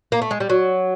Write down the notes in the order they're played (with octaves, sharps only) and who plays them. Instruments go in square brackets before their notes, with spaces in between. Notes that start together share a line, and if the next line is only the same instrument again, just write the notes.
[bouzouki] A#3
A3
G#3
G3
F#3